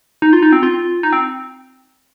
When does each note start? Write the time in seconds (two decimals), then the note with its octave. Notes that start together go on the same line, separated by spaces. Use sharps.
0.22 D#4
0.33 F4
0.42 D#4
0.52 C4
0.63 F4
1.03 D#4
1.13 C4